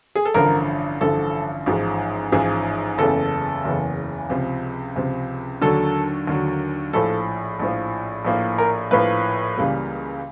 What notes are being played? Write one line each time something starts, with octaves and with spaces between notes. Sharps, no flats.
G#4
A4
A1 G2 D3 F3 A#4
A1 G2 D3 F3 A4
A1 G#2 F3 G#3
A1 G#2 F3 G#3 G#4
F#1 E2 C#3 E3 A4
F#1 E2 C#3 E3
C#2 C3 F3
C#2 C3 F3
D#2 D3 F#3 A4
D#2 D3 F#3
A#1 A2 F3 A4
A#1 A2 F3
A#1 A2 F3 A#3
A#4
A#1 A2 F3 A#3 B4
C#2 C#3 E3 G3 A#3